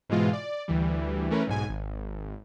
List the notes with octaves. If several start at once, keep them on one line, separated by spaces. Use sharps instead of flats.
G#2 B2 E3 G#3 F4
D5
D2 E3 G3
E3 A3 C#4 A#4 B4
B1 G#2 G#5
G#1